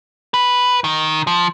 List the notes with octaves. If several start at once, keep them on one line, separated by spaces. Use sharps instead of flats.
B4
D#3
F3